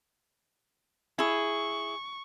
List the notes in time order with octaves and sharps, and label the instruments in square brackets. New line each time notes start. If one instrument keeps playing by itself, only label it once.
[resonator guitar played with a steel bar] E4 G#4 [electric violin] C#6